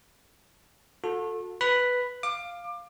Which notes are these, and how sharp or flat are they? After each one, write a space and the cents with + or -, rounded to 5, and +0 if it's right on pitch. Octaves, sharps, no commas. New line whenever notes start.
F#4 -40 A4 +10 A5 +0
B4 +0 B5 +0
F5 +0 D6 +25